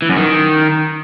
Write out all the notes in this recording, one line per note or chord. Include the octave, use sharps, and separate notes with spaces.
E3
F#2
D#3